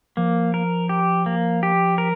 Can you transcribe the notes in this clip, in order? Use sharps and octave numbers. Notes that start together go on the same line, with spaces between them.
F3 A#3
A#4
G4
A#3
G4
A#4